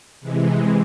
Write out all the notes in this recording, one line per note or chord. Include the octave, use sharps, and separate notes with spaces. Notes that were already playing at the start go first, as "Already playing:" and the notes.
C3 E3 G#3